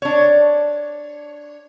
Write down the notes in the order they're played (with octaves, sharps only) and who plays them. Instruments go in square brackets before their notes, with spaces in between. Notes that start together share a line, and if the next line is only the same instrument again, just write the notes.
[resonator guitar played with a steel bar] D4 C#5